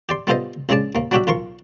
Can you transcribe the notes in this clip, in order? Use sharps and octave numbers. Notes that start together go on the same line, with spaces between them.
G4 D5 C6
G3 B3 F4 A4 C5 D#5
A#1 C#3 G#3 G#4 D5 A5
D#2 A#3
F#3 G3 D4 F#4 G4 E5
B1 F4 A#4 C6 C#6